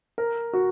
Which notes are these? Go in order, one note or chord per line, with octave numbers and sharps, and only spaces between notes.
A#4
F#4